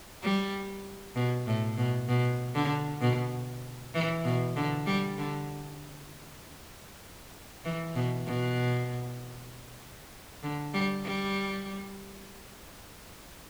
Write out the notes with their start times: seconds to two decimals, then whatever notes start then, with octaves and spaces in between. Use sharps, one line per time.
0.23 G3
1.16 B2
1.47 A2
1.78 B2
2.09 B2
2.55 D3
3.01 B2
3.94 E3
4.25 B2
4.56 D3
4.87 G3
5.18 D3
7.65 E3
7.96 B2
8.27 B2
10.43 D3
10.74 G3
11.05 G3